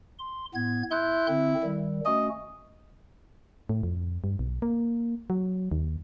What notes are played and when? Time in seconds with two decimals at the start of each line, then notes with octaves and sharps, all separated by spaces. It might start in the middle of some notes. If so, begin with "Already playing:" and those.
0.19 C6
0.55 A2 B3 G#6
0.91 E4 C6 F#6 G6
1.28 D3 C4
1.63 D#3 G3
2.05 A3 C#4 F#4 D#5
3.69 A2
3.83 F2
4.24 G2
4.39 B1
4.62 A#3
5.30 F#3
5.72 D#2